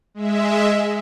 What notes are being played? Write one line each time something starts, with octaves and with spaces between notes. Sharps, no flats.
G#3 E5